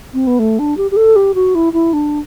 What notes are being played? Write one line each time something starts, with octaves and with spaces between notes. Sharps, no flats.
C4
B3
A3
D4
G4
G4
A4
G4
F#4
E4
E4
D4